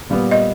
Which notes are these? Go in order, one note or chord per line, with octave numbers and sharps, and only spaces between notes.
A#2 G3 B3
D#5